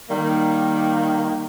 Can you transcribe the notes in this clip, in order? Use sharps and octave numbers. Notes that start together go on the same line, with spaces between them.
D#3 G3 A#3